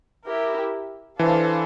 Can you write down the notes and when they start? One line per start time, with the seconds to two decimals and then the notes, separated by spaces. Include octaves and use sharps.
0.25 E4 G4 A#4
1.19 E3 D4 A4 C5 F5 A5